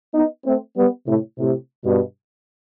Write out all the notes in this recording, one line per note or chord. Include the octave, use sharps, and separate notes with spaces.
B3 D#4
A3 C4
G3 B3
A2 C3
A2 C3
G2 B2